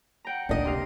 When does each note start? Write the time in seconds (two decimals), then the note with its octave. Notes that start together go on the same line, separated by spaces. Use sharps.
0.25 F#5 G5 A#5
0.49 D2 A#2 D4 D#5
0.65 C3 F5